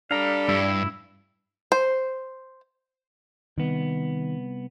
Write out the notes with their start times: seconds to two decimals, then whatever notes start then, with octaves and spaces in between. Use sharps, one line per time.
0.11 G3 D4 G4 A4 F5 A#5
0.49 G2 E4
1.72 C5
3.58 C2 D#3 B3